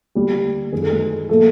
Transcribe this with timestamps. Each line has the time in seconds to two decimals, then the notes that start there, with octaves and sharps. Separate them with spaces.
0.15 D2 D3 G3 A#3 G4
0.72 F#2 D#3 F#3 G#4
0.81 A4
0.90 G#3 G#4
1.29 A#2 F3 A3 A#3 A4